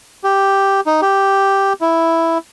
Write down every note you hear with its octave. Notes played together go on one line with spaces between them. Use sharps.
G4
D#4
G4
E4